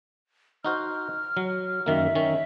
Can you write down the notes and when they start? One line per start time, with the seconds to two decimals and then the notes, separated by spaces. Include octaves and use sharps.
0.65 D#4 F#4 C5 F6
1.37 F#3
1.86 F#2 D#3 A#3 E5
2.15 D#3 C#4